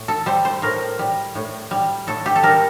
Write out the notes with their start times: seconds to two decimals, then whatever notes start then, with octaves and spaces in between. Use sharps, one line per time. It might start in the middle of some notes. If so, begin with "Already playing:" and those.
Already playing: A2
0.08 A4
0.26 G3 C5
0.45 C5
0.62 A2 A#4
0.99 G3
1.35 A2
1.71 G3
2.07 A2 A4
2.26 G4
2.36 A4
2.43 G3 A#4